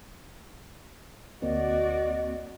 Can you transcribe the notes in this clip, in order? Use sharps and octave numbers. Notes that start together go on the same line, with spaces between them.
D2 A#3 C4 F#4 D5 D#5